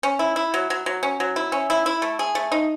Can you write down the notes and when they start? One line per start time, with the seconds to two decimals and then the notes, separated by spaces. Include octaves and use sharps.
0.03 C#4
0.19 E4
0.36 E4
0.54 F#3
0.70 F#3
0.86 F#3
1.03 C#4
1.20 F#3
1.36 E4
1.52 C#4
1.70 E4
1.86 E4
2.02 A3
2.19 G#4
2.35 A3
2.52 D#4